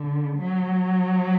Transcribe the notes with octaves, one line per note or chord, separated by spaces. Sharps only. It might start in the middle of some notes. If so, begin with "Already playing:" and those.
Already playing: D3
F#3